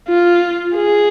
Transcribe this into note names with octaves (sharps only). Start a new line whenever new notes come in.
F4
G#4